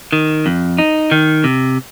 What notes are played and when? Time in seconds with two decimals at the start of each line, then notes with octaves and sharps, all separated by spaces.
0.13 D#3
0.46 F2
0.78 D#4
1.12 D#3
1.44 C3